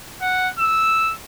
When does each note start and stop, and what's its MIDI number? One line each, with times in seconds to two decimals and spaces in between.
0.21 0.48 78
0.59 1.14 88